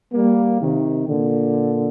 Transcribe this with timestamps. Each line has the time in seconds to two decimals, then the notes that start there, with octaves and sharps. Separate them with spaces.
0.14 G3 A#3
0.61 C3 D#3
1.07 A#2 D3